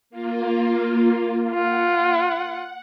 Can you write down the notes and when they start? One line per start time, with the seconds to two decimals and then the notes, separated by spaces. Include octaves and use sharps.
0.10 A#3 F4
1.54 F4 F#5